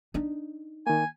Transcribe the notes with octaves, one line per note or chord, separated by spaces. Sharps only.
D4 D#4
D#3 A#3 G#5